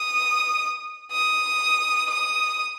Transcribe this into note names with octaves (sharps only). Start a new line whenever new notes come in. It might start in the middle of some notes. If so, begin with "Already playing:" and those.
Already playing: D#6
D#6
D#6